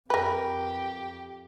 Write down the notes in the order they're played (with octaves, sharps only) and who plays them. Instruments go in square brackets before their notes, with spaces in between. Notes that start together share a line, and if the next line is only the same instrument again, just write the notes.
[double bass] F2 [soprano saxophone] G4 [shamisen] A#4 B4